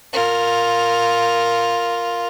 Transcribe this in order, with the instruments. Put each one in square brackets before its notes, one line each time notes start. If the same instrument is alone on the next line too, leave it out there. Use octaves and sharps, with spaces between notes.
[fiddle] F4 A#4